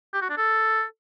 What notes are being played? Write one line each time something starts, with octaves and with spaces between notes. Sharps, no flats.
G4
F#4
D4
A4